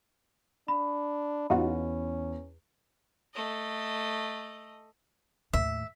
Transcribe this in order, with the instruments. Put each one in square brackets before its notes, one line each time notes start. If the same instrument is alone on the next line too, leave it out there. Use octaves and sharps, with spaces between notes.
[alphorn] D4 [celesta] B5
[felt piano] E2 [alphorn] C#4 [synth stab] D#4 F4 F#4
[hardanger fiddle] A3 D#5
[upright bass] D#2 A2 [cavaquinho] E5